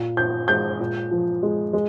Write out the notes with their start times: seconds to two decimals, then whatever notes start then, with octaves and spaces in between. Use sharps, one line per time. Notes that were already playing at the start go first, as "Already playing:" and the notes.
Already playing: A#2
0.17 A#2 G6
0.48 G#3 G6
0.80 A#2
1.11 F3
1.43 G#3
1.73 G#3